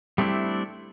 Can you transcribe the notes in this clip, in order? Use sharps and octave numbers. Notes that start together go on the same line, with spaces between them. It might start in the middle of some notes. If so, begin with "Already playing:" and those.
G3 A3 C4 D4 E4